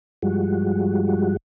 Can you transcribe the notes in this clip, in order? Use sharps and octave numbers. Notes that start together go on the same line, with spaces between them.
G2 F3 G3 G#3 F#4